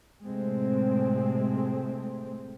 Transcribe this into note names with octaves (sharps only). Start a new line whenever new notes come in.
A2 C3 G#3 A3 C4